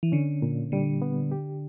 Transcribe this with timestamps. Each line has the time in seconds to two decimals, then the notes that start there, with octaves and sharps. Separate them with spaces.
0.03 E3
0.12 D3 C#4
0.42 A#2
0.72 D3 G3
1.02 B3
1.31 G4